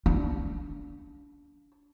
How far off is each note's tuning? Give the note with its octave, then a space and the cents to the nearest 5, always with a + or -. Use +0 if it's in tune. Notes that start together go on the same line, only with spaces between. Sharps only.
D4 -25